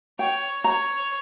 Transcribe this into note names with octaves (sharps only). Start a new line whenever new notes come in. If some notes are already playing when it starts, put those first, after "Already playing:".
C#5 G5
C#5 A#5